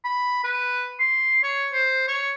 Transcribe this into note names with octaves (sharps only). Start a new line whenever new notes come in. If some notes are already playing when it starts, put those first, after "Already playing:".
B5
B4
C6
C#5
C5
C#5